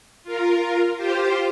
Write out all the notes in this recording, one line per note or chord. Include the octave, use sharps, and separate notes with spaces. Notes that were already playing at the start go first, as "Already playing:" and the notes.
F4 A#4
F4 G4 C5